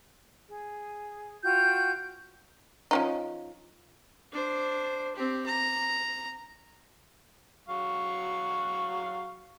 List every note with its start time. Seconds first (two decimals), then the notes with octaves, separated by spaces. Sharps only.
0.48 G#4
1.44 F4 F#4 G5 G6
2.91 F3 C#4 D#4
4.32 D4 C5
5.15 C4 G4
5.46 A#5
7.68 F#3 F5 C#6